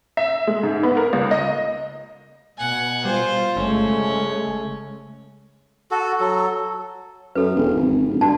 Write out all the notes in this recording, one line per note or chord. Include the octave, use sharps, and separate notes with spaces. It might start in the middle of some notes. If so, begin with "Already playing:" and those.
E5
G#3
G#2
B3
A#4
C#2
D#5
B2 F#5 G#5
G3 F4 C5
G1 C#3 G#3 A3 C#4
F#4 A4
F#3 A4
F#2 A4 B4
E1
G#1
D1
G2 F#4 D5 A5